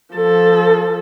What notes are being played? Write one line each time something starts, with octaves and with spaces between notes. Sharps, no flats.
F3 A4